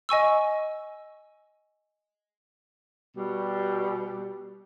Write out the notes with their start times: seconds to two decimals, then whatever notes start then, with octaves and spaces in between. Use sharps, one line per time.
0.09 D#5 G#5 C#6 E6
3.15 B2 G3